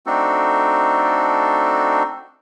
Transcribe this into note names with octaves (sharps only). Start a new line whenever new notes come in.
A3 C4 D4 D#4 F#4 A4